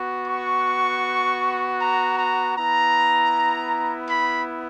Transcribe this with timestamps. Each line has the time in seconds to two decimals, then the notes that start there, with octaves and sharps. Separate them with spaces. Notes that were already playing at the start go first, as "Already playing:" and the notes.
Already playing: B3 F#4
0.27 C#6
1.80 A#5
2.18 A#5
2.56 B3 E4 A#5
4.09 B5